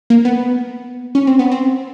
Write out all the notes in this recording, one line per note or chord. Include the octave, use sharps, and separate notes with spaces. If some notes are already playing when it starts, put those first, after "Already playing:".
A#3
B3
C#4
C4
B3
C4